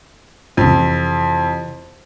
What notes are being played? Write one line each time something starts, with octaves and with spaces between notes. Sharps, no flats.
F2 C3 E3